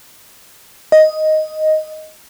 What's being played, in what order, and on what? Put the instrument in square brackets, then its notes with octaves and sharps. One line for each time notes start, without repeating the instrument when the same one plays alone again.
[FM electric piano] D#5